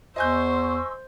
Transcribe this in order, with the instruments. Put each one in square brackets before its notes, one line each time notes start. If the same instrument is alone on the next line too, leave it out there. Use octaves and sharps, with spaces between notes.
[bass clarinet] E2 [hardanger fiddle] C5 [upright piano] D#5 G#5 G6 [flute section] C6 C#6 E6